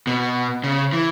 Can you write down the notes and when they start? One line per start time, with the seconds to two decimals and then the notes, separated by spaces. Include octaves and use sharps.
0.07 B2
0.64 C#3
0.93 E3